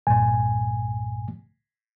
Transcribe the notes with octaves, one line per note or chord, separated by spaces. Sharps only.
C2 G2 A#2 G#5